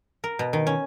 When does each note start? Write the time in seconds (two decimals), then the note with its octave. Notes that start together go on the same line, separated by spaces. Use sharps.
0.24 A#4
0.39 B2
0.53 D#3
0.67 C#4